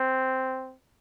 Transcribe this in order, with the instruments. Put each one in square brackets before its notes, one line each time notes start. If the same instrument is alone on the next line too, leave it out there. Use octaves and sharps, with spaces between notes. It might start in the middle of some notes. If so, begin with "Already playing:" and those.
Already playing: [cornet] C4